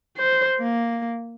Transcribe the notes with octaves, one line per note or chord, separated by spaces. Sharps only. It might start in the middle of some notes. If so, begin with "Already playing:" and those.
C5
A#3